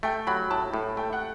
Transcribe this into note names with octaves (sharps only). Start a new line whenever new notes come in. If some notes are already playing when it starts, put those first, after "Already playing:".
A3 G5
F#3 B5
A2 A5
A2
A3 G5
F#5